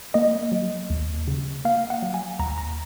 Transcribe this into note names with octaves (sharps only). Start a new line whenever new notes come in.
A#3 D#5
F#3
D#2
C#3
A#3 F5
F#5
F#3
G#5
D#2 A#5
A#5